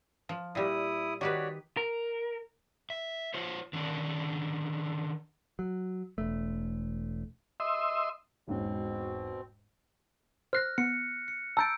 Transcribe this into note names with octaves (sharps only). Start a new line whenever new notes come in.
F3
A#2 G3 E4 D#6
D#3 F#4 G4 B4 C#5 D5
A#4
E5
F4 C5 C#5
D3 D#3 C#4 D4
F#3
E1 A3
D#5 E5 C6
E1 G#2 B2 C4 C#4
C5 F6 F#6 A#6 C7
B3 C#7
C#7
A5 A#5 E6 G6 A6 D7